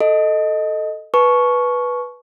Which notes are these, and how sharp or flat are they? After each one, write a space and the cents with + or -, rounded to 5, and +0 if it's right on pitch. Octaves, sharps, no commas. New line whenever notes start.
A4 +0 D#5 +0
B4 -10 A5 -40 C#6 +0